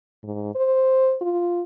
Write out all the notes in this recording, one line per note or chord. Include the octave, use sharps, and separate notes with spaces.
G#2
C5
F4